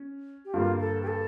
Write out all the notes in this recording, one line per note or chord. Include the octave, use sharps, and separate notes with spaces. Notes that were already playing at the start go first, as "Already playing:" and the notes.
Already playing: C#4
G4
G2 D3 G3 A#3 F4
A4
G4
A4